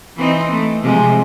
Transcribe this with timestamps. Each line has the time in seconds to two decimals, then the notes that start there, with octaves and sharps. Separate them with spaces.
0.17 E3 C4 D#4
0.52 A3
0.83 C3 F3 G#3